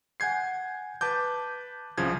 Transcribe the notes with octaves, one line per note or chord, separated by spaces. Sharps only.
F#5 G#5 G6 G#6 C7
B4 A5 D6 G6
C2 C#3 F3 G#6